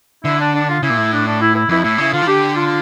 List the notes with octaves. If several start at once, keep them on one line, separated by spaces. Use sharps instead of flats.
D3 E4
D4
D4
F4
C#3 E4
A#2
A2
D4
D4
E4
E4
F2 E4
A2 E4
C#3 E4
D3 F4
E3
D3 G4
F4